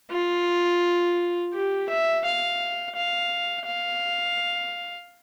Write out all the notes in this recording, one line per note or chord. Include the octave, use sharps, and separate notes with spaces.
F4
G4
E5
F5
F5
F5